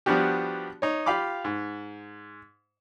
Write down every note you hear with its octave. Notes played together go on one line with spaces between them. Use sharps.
F3 G3 B3 D4 F#4 G4
D#4 C#5
F4 G4 F5 B5 D6
G#2